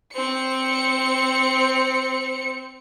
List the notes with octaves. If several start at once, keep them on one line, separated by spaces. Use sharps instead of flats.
C4 C#7